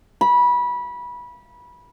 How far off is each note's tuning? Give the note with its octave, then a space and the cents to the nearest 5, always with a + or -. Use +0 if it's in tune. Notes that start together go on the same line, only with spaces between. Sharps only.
B5 -20